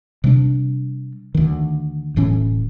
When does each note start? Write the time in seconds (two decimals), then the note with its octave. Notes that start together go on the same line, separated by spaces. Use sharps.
0.24 C3 G3 D4
1.35 D2 D#3
2.16 D1 A2 E3 C#4